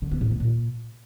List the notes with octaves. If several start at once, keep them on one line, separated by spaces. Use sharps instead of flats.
D3
B3
A2
D#3
A#2